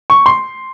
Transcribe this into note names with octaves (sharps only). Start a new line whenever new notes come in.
C#6
C6